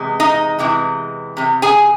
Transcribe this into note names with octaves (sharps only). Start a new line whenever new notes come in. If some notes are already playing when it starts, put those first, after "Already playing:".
Already playing: E2 C3 G#3
D#4 D#5
E2 C3 E3 G#3
E2 C3
G#4 G#5